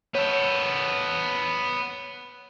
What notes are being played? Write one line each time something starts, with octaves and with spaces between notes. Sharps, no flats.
B3 A4 C#5